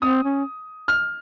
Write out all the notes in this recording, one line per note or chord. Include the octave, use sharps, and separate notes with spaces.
C4 D#6
C#4
F6